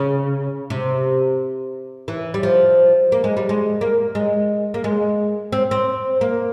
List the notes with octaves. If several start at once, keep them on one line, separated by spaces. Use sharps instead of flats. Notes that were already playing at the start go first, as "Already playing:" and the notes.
Already playing: C#3
C3
E3
G3
F3
A#3
G#3
G3
G#3
A#3
G#3
A#3
G#3
C4
C4
A#3